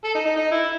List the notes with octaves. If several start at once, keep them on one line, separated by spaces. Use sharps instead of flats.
A4
D#4
D#4
D#4
E4